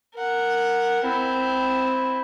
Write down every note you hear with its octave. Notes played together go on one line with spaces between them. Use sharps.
A#4 F#5
C4 E4